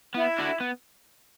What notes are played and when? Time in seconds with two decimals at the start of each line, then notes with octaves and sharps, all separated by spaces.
0.14 B3 E4
0.38 D4 F#4 A4
0.60 B3